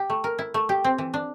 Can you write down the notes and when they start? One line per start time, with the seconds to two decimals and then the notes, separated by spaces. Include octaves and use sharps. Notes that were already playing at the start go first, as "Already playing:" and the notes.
Already playing: G4
0.10 A3
0.24 A#4
0.39 E4
0.54 A3
0.69 G4
0.84 C4
0.98 E3
1.14 D4